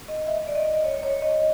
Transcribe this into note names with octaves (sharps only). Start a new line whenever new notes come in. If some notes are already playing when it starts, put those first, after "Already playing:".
D#5
E5
D5
D#5
C#5
C#5
D#5